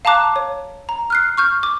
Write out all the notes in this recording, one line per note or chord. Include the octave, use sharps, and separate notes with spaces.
F5 A5 A#5 D6 F#6
C#5
A#5
F6 F#6 C7
C#6 F6 G6
D6